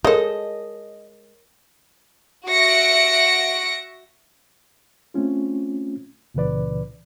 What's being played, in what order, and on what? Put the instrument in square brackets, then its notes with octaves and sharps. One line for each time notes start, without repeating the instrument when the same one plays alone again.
[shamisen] G#3 A4 [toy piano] A#4 C#5 [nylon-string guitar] D#5
[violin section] F#4 E5 A#6 C#7 D7
[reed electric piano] A3 C4 C#4 F4
C#2 A#2 C#3 E3 B4 D5